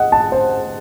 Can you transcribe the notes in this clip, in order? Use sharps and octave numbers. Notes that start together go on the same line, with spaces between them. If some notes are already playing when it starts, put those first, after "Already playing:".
Already playing: D#5 F#5
A5
C5